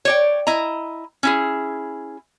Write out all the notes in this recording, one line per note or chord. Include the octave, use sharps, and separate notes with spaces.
C#5 D5 G5
E4 D#5 A#5
C#4 E4 G#4